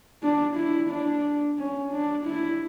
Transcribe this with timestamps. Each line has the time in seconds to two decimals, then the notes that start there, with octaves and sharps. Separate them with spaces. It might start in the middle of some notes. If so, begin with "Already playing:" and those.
0.23 D4
0.56 E4
0.90 D4
1.58 C#4
1.91 D4
2.26 E4